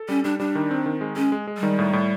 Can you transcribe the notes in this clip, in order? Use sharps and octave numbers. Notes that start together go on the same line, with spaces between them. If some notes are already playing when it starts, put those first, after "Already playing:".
Already playing: A4
G3 C#4
G3 D4
G3 D4
D#3
C4
D#3
G#3
G#3 C#4
G#3
G#3
G3
D#3
A2
A2